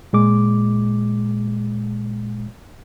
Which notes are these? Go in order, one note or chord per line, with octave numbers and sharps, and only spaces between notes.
A#2 G#3 D6